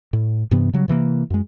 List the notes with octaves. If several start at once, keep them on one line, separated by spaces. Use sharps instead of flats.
A2
G2 C3 E3 B3
C#3 F#3 G3
C3 E3 F#3 A#3
F#2 G#3